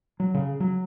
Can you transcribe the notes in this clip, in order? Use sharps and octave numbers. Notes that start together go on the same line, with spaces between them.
F#3
C#3
F#3